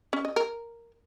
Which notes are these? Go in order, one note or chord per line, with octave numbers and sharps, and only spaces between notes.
C#4
D#5
A#4